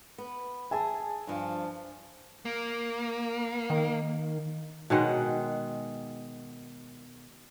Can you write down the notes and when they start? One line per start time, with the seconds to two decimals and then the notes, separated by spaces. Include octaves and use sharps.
0.18 B3
0.71 G#4 E5 G#5 A5
1.27 G2 F3
2.45 A#3
3.70 D#3
4.90 B2 D#3 G#3 F#5